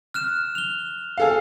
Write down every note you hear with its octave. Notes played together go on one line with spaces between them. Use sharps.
F6 F#6 E7
F7 G7
G#4 A4 F5